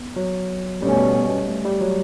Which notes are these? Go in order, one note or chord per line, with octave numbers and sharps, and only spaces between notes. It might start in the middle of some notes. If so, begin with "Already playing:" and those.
Already playing: B3
F#3
B2 G3 A3 C#4
A3
G3
F#3